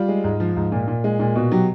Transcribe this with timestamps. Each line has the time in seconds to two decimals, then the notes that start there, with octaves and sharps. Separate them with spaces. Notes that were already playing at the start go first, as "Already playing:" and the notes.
Already playing: G3 F4
0.09 G#3
0.24 G#2
0.40 F3
0.56 G#2
0.72 A#2
0.88 A#2
1.04 G#3
1.19 A#2
1.35 B2 F#4
1.52 F#3 G4